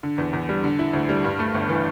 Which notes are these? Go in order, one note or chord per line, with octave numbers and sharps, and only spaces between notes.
D3
E2
E2
G3
D3
E4
D2
G3
G2
A3
G1
E3